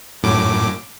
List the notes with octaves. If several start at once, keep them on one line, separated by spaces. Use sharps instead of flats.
F#2 A2 D6